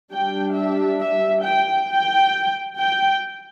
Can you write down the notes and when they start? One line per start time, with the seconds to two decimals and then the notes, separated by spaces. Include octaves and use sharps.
0.12 G3 D4 G5
0.56 E5
1.01 E5
1.44 G5
1.89 G5
2.78 G5